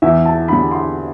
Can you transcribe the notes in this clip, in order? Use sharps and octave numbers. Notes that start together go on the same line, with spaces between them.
E2 E5
A5
D3 G3 B5
C6